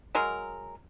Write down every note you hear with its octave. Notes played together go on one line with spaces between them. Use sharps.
F#3 G#3 A#4